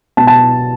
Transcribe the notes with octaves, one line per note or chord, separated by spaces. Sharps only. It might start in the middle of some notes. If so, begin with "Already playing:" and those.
B2 A5
A5